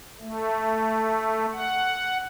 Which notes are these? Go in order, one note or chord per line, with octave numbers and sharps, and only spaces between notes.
A3
F#5